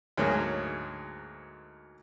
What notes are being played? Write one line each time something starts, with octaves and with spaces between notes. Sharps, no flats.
D2 G#2 F#3 A#3 G#4